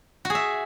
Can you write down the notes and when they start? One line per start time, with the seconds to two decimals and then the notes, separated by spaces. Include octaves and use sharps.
0.25 F#4
0.30 G#4
0.35 E5